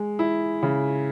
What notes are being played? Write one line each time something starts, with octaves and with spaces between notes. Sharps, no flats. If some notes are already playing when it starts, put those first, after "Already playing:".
Already playing: G#3
E4
C#3